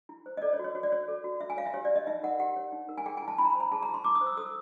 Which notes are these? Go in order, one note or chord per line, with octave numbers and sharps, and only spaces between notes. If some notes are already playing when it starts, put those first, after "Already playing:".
E4
C5
D#5
A4 D5
C#5
F#4
C#5
F#4 C#5
D5
C#5
A4
F#4
F#4 E5
G#5
C#5 F5
E5
G4 C#5
D5
C#5 D#5
D#4 E5
A#4 F#5
G4 F#5
C#5
D#4
A#4
G#5
G#4 G5
G#5
E4
A5
E4 B5
A#5
B5
C5
A#5
G#4 A5
A#5
E4
C6
E4 D6
D#6
C5
E6
A4 D#6